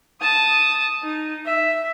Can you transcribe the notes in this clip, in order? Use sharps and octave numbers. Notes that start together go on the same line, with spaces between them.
A5 D#6
D#4
E5